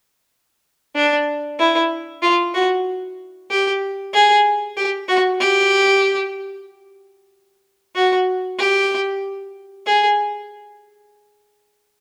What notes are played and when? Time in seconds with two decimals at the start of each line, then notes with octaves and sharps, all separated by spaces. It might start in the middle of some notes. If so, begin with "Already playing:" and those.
0.95 D4
1.59 E4
2.22 F4
2.54 F#4
3.50 G4
4.14 G#4
4.77 G4
5.09 F#4
5.41 G4
7.95 F#4
8.59 G4
9.86 G#4